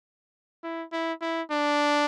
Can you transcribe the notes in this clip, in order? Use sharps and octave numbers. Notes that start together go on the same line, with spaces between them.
E4
E4
E4
D4